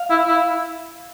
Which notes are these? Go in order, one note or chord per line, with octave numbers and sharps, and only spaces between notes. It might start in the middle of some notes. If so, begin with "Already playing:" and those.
Already playing: F5
E4
E4